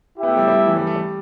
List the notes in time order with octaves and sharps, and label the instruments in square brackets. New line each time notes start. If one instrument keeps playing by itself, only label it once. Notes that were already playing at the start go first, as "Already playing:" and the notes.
[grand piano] B3 [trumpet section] E4 G4 E5 G5
[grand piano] A3
G3
G3
A3
E3
G3
A3
G3